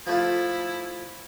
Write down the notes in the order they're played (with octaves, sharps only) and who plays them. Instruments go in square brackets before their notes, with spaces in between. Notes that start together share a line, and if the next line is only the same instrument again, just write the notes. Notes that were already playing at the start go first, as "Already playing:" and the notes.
[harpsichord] F3 A3 F4 [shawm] E4